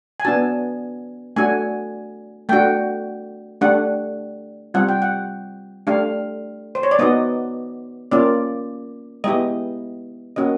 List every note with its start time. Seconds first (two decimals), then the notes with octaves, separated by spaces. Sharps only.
0.20 G#5
0.25 B3 D4 F#4 A5
1.36 A3 D4 F#4 G#5
2.49 A3 D4 F#4 G5
3.61 A3 D4 G4 F#5
4.74 G3 C4 F4 F#5
4.89 G5
5.02 F#5
5.87 A3 D4 G4 F5
6.75 C5
6.83 C#5
6.91 D5
6.99 B3 D#4 F#4 D#5
8.11 A#3 C#4 F4 D5
9.24 G#3 B3 E4 G4 D#5
10.36 A#3 C#4 F#4 D#5